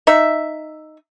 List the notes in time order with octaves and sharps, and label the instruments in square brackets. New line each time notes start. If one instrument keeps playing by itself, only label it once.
[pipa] D#4 E5